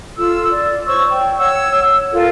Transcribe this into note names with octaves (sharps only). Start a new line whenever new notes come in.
F4 A4 E6
D5
C5 C#5 C#6 E6
G5
C#5 F#5 E6
F4 A4 A#4